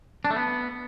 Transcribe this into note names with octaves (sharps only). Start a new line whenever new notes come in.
D4
A3
B3